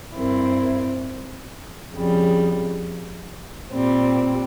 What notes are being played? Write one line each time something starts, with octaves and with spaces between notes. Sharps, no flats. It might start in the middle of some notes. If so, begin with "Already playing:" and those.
G2 G3 C4 E4 A#4
F2 C#3 G3
A#2 G3 C4